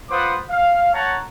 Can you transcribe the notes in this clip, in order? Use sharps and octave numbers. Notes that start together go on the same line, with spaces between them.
F4 B4 C5 F#5 D6 D#6
F5
C#5 F#5 A5 A#5